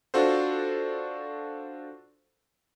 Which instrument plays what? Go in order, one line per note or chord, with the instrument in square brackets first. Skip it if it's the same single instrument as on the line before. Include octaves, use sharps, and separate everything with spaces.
[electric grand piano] D4 F4 F#4 A4 C5